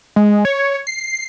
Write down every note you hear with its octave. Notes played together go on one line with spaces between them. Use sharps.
G#3
C#5
C7